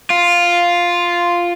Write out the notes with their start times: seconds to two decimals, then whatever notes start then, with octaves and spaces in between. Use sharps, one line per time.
0.10 F4